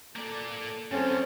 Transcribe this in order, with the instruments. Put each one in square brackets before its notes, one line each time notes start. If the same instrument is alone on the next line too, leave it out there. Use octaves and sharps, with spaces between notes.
[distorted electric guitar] A#3 D5 [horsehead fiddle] A4
[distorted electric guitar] F#2 [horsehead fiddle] C4 A4 [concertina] C#4